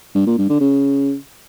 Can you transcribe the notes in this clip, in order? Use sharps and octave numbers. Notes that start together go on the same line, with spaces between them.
G2
A#2
G2
D3
C#3